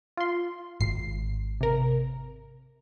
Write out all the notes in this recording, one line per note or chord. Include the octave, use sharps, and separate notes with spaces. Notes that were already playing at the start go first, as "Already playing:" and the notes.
F4 C6
G#1 C7
C3 A#4